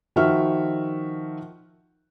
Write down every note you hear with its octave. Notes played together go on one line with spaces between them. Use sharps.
D#3 F3 F#4 E5 F6